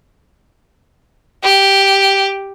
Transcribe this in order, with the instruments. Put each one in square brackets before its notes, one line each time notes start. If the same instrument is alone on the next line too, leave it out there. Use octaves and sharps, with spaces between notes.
[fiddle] G4